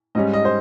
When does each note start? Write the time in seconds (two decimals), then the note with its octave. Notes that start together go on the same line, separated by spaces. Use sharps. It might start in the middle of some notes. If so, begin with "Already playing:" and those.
0.15 G#2 G3 C#4 D#5
0.33 D#5
0.45 C5